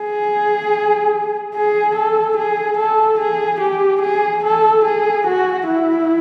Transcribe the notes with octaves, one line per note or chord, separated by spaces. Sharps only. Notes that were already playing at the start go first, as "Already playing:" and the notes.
Already playing: G#4
G#4
A4
G#4
A4
G#4
G4
G#4
A4
G#4
F#4
E4